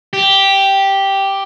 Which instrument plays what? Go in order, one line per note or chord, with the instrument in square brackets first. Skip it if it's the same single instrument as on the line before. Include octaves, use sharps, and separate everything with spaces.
[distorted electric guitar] G4